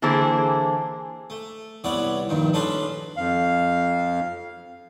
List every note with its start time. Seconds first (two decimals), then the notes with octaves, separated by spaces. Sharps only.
0.02 D3 E3 A#3 E4 G#4 C5
1.30 A3
1.84 C2 E3 B3 C#5 D5 F#5
2.29 A#1 G2 D#3
2.53 A3 C#4 D4 B4 C5 A5
3.17 F2 F5